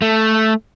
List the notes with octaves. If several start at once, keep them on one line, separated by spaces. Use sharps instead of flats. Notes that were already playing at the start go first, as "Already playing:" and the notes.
A3